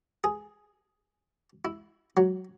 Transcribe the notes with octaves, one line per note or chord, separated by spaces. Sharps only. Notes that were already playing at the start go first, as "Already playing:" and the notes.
G#4
E4
F#3